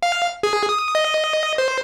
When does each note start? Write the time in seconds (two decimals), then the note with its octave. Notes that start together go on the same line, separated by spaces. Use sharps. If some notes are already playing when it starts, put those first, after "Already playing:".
0.03 F5
0.43 G#4
0.69 D#6
0.95 D#5
1.58 C5